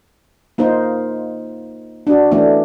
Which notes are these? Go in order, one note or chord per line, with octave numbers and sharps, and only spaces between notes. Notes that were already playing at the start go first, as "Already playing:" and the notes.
A#3 D#4 F4 C5
D4 F#4
E3 A3 C#4 D4